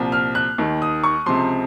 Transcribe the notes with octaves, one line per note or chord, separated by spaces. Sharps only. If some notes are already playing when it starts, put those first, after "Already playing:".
Already playing: C2 A#2 F3
F6
F#6
D#2 D#3
D#6
C#6
C#2 C3 F3 C6